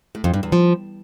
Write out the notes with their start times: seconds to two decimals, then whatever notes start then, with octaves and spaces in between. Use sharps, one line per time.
0.15 A2
0.24 F2
0.34 G2
0.43 E2
0.52 F3